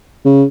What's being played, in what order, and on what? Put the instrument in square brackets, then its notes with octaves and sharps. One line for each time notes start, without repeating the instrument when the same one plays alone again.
[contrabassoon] C#3